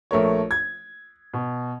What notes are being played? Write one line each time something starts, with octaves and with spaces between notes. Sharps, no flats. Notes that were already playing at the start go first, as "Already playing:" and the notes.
A#1 A3 A#4 C#5
G#6
B2